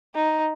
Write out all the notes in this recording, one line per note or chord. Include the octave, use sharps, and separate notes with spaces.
D#4